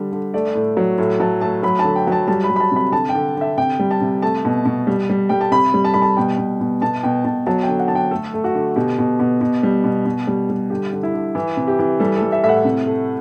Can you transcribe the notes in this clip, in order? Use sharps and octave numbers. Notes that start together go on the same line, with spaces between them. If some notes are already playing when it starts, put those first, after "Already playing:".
Already playing: D3 G3
D3
A3 D5
A2
F#3
A2
F#3 A5
A3 A5
F#3 B5
A5
D3
G5
F#3 A5
G3 A5
B5
G3
B5
A5
C3 B5
D3 A5
G5
D3
D3 E5
C3 G5
G3
A5
C3
A3 A5
B2
B2
G3
G3
G3 G5
A5
C3 B5
G3
A5
G3 B5
A5
B2 G5
B2
B2
B2 A5
B2 G5
B2 A5
F#3 A5
D3 G5
F#5
D3 A5
G5
A3 A4
A3
F#4
D3
B2 G4
B2
B2
B2
G3
B2
B2
G3
G3
D3 G4
D3
E4
D3
E3
C3
G4
E3
G3 A4
A4
G3
E5
A2 E5
F#5
C3
A3